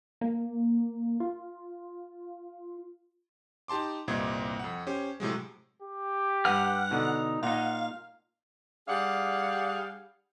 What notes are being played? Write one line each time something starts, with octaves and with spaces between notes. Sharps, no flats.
A#3
F4
D#4 G4 A5 C6 D6
C2 G2 A#2 C4 D#5 G#6
F2 F#5
C#4 G4 C5
A2 C3 F#3 G#3
G4
G2 B4 F#5 F6
B2 D3 D#4
A#2 D#4 F5 F#5
G3 D4 G#4 F5 F#5